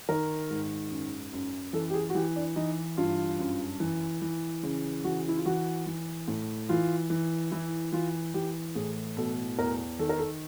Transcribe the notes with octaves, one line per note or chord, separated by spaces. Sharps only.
D#3 A#4
G#2
F#2
F#2
E3 A4
G4
G#4
F#4
E3 G4
D4
E3 D#4
G2 F4
F#2
E3
E3
C#3
E3 F#4
E4
F4
E3 F#4
E3
A2
E3 F4
E3
E3 E4
E3 F4
E3 G4
A2 G#4
B2 A4
E2 A#4
D#3 A4
A#4
A4